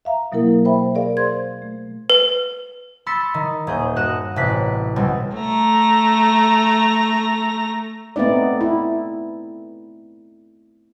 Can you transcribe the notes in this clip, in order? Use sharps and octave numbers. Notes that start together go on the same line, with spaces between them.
E5 F5 A#5
B2 F#3 A#3 E4 A#4
C5 E5 G5 B5
G#4 A#4 D5 F5
C5 C6 G#6
A3
B4
B5 C6 E6 A6 B6 C#7
D#3
D#1 G#4 G6
G2 F#4 D#5 F#6 E7
A1 C3 C#4 F#6 B6
C#2 B2 G3 C4
A3 A#5
A3 B3 C4 D#4 D5
E4